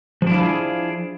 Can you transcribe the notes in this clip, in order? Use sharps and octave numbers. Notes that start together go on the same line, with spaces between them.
F3 D4 E4 F4 G#4